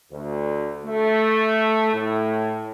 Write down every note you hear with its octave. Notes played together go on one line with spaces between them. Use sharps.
D2
A3
A2